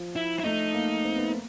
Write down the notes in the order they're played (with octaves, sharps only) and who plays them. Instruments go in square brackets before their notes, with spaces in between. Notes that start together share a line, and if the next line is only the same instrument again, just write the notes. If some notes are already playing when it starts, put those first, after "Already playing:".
Already playing: [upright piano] F3
[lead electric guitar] E4
E4
[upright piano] A3 [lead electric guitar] D#4
[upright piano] A#3
C4
B3
A#3